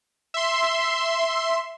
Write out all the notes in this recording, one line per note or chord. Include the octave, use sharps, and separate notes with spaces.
E5 C6